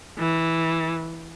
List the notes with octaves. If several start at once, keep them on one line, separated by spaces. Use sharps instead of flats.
E3